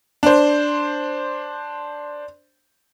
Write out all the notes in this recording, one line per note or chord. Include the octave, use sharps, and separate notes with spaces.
D4 C5